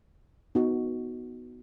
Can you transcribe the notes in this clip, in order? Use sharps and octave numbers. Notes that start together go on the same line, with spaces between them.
B3 D#4 F#4